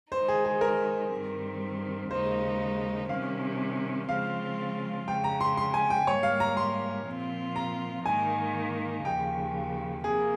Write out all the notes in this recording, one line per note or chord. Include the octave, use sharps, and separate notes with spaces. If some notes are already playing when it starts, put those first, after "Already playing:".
D#3 G#3 D#4 C5
G#4
G#4
A#4
G2 D#3 G3 C4
D#2 C#3 G#3 D#4 C5
C3 D#3 G3 C#4 F5
C#3 F3 G#3 C4 F4 F5
F2 C#3 G#3 G5
A#5
C6
C6
G#5
G5
G#2 G3 A#3 C#5
F5
A#5
C6
A#2 F3 C4 F4
A#5
G#2 D#3 A#3 D#4 G#5
D#2 C#3 F3 G5
C3 F3 A#3 G#4